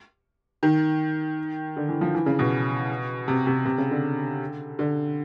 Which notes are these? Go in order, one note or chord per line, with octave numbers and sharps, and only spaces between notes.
D#3
D3
E3
F3
E3
C#3
B2
C3
C3
C3
C#3
D3
D3